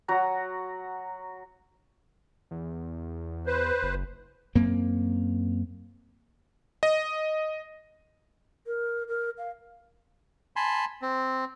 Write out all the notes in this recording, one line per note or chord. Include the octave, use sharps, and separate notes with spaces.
F#3 F#4 F#5 A#5
E2
B4 C5
F#1
F#2 A#3 C4
D#5
A#4
A#4
F5
G#5 A5 B5 C6
C4